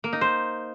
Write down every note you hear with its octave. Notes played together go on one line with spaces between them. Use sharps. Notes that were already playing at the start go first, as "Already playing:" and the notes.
A#3
D#4
C5